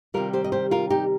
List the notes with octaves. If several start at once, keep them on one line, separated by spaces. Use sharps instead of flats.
C3 D#3 G3 F4 A#4
G4 C5
D#5
G4 C5
F4 A#4
D#4 G4